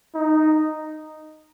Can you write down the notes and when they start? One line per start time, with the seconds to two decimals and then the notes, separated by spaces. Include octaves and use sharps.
0.14 D#4